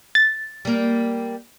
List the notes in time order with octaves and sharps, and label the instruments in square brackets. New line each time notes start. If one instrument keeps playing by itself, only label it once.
[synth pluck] A6
[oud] G3 A#3